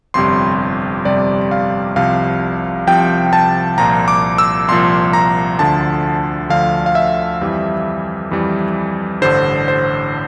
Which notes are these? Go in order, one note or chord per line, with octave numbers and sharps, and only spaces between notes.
G1 F2 C3 G3 C6
G1 F2 C3 G3 D5
F5
C2 C3 F3 F5
C2 C3 F3 G5
A5
C2 A#2 F3 A#5
D6
E6
C2 A#2 F3 C6
A#5
D2 D3 F3 A5
D2 D3 F3 F5
F5
E5
F2 E3 G3
F2 E3 G3
A1 G2 D3 C5
C5